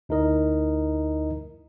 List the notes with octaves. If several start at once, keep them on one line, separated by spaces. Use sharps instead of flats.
D2 D#4 E4 A#4 D#5